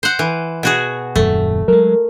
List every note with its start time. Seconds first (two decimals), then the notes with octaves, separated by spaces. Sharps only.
0.03 C5 F#5
0.19 E3
0.63 B2 F#4 G#4
1.16 D#1 F#2 A3
1.68 F#3 G#3 A#4